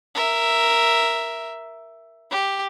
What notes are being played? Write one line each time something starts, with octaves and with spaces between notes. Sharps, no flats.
A#4 E5
G4